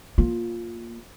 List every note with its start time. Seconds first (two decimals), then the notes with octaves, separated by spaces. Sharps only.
0.18 A#3 F4